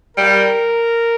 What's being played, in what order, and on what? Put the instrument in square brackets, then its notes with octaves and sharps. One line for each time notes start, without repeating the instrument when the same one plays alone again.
[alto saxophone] G3 [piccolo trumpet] A#4